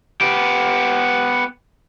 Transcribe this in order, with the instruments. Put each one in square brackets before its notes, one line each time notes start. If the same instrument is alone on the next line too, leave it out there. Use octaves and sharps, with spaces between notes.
[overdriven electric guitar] B3 G4